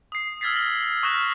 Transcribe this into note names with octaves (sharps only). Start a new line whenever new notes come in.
D#6 C7
E6 F6 G#6 A6 B6 C7
A#6 F#7 G7
C#6 D#6 F6 F#6 A#6 E7